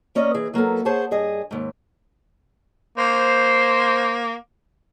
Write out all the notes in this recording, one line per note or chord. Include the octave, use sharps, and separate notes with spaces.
A#3 C#4 D5 D#5
E3 G#4
F#3 A#3 B3 A4
G#4 C5 C#5 F#5 A5
G2 G#4 D#5
D#2 G#2
A#3 C5